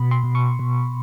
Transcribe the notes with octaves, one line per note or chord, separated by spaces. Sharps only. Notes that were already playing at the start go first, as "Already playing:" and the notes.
Already playing: B2 B5
C6
B2
C#6
B2